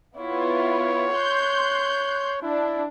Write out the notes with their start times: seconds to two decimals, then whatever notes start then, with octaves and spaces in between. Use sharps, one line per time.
0.17 B3 E4 F4 C#5
1.14 C6 F#6 G6
2.43 D4 E4